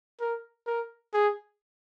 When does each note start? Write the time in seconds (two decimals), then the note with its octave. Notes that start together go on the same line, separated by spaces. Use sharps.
0.20 A#4
0.67 A#4
1.14 G#4